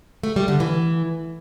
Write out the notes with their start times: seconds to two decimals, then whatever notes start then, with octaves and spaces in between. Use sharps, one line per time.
0.23 A3
0.36 G3
0.48 D3
0.60 E3